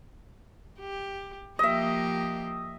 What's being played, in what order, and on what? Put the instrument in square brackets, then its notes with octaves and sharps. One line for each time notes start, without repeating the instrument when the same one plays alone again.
[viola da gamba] G4
[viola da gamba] F3 A#3 G4 [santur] D#5 E5